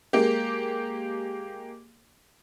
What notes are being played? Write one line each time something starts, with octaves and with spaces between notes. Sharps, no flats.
G#3 A#3 G4